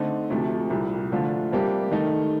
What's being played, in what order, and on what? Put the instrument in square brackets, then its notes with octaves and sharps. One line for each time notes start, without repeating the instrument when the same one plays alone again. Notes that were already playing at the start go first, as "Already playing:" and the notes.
Already playing: [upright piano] D3 A3 C4 D#4
D2 C3 F3 A3
C2 A#2 G3
D3 F3 A3 D4 F4
C3 G3 A#3 D4 G4
D#3 A3 D#4